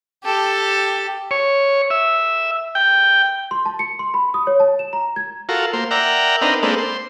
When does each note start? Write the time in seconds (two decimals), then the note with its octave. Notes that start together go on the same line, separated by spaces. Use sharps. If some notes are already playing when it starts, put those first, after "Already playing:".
0.24 G4 A4
1.31 C#5
1.90 E5
2.75 G5
3.51 C6
3.66 A5
3.79 C#7
3.99 C6
4.14 B5
4.34 D#6
4.47 C#5
4.60 A5
4.79 E7
4.93 A#5
5.16 G#6
5.49 F4 F#4 A4 A#4
5.73 A#3 C5
5.91 A#4 D5 E5 F#5 G5 A#5
6.42 C4 D4 D#4 A#4 B4
6.63 G#3 A#3 C4 D4 A4 B4
6.78 C5